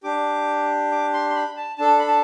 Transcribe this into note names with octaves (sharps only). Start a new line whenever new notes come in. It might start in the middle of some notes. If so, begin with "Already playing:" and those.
D4 G4 D6
D6
C6
C6
B5
A5
D4 A4 A5
B5
A5